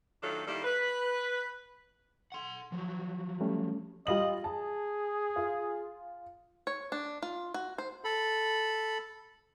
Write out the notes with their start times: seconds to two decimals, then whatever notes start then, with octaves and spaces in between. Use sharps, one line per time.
0.23 D#3 F#3 A3 D4 F4 A4
0.47 D#3 G3 A#3 E4 A4
0.64 B4
2.32 F#5 C6
2.72 F3 F#3
3.41 G3 A3 C#4
4.07 G3 F4 D#5 F#7
4.44 G#4 A5
5.36 F4
6.67 C#5
6.92 D4
7.22 F4
7.54 F#4
7.78 C5
8.04 A4 B5